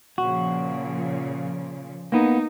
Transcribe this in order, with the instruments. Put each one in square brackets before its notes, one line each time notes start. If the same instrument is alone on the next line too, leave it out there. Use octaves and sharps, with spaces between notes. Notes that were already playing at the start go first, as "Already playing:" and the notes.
[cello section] A#2 C#3 F3 [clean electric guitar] F#4
[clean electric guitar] A#3 B3 [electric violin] D#4